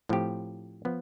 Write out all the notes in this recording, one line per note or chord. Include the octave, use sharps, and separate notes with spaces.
A2 F3 C4 G4
F3 B3